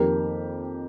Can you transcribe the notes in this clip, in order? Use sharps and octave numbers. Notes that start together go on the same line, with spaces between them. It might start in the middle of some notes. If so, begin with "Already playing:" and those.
Already playing: F2 D#3 A#3 G4 A#4